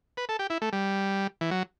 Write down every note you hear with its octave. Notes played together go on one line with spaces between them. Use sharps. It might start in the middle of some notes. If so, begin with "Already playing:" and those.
B4
A4
G4
E4
A3
G3
E3
F#3